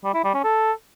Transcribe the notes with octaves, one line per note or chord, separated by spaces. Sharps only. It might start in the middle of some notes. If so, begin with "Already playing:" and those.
G3
E4
G3
C#4
A4